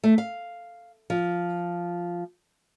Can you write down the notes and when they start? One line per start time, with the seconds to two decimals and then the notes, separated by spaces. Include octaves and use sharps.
0.04 A3
0.18 F5
1.10 F3